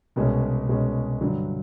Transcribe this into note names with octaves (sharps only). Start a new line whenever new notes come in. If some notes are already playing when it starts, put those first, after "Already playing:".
C2 B2 G#3 C#4
C2 B2 G#3 C#4
G2 D3 F#3